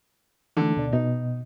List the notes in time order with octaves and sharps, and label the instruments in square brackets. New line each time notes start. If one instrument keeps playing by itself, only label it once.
[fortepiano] D3 [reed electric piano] E3 A3
[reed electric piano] D2 B2 D5
[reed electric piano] B2 [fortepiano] D#4